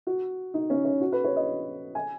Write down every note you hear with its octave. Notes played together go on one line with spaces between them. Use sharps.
F#4
D#4
C#4
C#4
F#4
B4
C#5
D#5
G#5